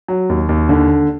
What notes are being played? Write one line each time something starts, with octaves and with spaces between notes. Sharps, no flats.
F#3
D#2
D#2
D3